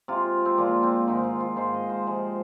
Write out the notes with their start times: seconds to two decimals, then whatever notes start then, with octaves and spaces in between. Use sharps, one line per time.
0.08 C3 G#3 F4
0.45 C4
0.58 A#2 F3 G#3 A#3
0.83 C4
1.07 G#2 D#3 G#3 D#4
1.24 F4
1.40 F4
1.57 G#2 D#3 G#3 C5
1.74 D#5
1.90 C5
2.07 C3 F3 G#3